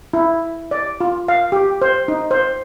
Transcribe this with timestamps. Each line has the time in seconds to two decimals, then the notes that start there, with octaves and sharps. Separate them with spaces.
0.13 E4
0.71 D5
1.01 F4
1.28 F5
1.52 G4
1.82 C5
2.08 D#4
2.31 C5